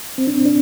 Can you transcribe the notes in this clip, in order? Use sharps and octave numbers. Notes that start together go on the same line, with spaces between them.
C4
D4
C4
D4